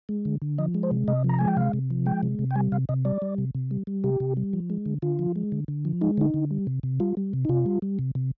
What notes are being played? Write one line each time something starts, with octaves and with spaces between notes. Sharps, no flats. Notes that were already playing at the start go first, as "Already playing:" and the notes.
G#3
D3
D3
F3 D#5
G#3
C5
C3
C3 D#5
F3
A#5
G#3 G#5
G5
C3 F5
C3
F3
G#3 G5
C3
C3
G5
G3 G#5
C3 F5
C3 D#5
G3 D5
G3
C3
C3
G3
G3
C3 G4
C3
G3
F3
G#3
D3
D3 F4
F3
G#3
D3
D3
F3
G#3 D#4
D3 D#4
D3
G3
C3
C3
G3 F4
G3
C3
D#4
C3 F4
G3
G3
C3
C3